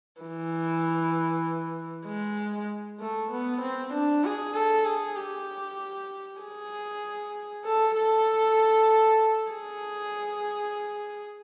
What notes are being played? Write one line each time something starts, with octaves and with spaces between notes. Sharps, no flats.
E3
G#3
A3
B3
C4
D4
G#4
A4
G#4
G4
G#4
A4
A4
G#4